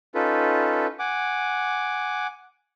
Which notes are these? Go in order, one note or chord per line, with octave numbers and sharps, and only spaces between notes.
C#4 D#4 F4 A4 B4
F#5 G#5 D6